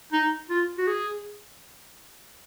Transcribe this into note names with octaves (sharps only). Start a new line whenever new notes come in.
D#4
F4
F#4
G#4